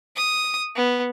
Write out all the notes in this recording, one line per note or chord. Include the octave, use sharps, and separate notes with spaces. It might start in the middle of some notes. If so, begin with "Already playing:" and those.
D#6
B3